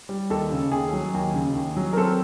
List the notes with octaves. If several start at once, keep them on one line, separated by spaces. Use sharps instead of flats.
G3
D#2 A4
C#3
D#2 G#4
F#3
D#2
C#3
D#2
F#3
A#4
C4 A4